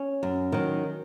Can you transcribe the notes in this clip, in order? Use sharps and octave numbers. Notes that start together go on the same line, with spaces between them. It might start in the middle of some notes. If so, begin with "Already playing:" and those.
Already playing: C#4
F#2
D#3 F#3